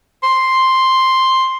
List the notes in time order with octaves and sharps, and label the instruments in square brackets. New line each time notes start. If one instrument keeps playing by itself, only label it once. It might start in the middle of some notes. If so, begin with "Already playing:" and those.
[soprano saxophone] C6